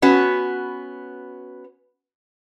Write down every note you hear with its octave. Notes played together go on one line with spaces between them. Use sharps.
B3 C#4 F#4 B4